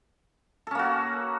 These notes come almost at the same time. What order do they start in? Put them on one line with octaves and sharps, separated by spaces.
A4 C#4 A#3 F#4